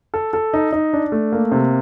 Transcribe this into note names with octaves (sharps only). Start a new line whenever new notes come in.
A4
A4
D#4
D#4
D4
A3
A#3
C3